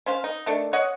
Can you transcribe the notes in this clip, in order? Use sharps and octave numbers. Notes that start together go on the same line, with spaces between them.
C#4 C5 F5
D#4
D#3 A3 D4
C#5 D#5 F#5